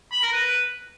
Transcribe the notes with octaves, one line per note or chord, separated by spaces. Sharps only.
B5
A#4
B4